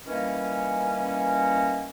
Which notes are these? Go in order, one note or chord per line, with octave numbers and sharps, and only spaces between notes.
D#3 E3 G3 A#3 C#4